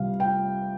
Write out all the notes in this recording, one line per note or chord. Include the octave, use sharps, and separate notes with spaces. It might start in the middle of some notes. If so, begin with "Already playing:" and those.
Already playing: C2 C3 G3 F5
G5